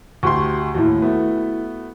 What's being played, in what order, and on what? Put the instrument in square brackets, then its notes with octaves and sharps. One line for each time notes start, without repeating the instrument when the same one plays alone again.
[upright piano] D2 G4 C6 [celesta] C#6
[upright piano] D#2 A2 [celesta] E4 F#4
[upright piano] A3 B3